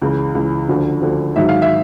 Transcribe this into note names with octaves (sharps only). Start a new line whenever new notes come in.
C#2 C#3 E3
C#2 C#3 E3
D2 D3 F3
D2 D3 F3
G#2 D#3 F#3 E5
F5
E5